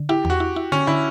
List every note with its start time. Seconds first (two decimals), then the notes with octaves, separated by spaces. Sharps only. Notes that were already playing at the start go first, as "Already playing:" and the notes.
Already playing: D3
0.09 E4 G4
0.25 E2 F#4
0.40 E4
0.56 E4
0.72 D3 C#4
0.87 D3 E4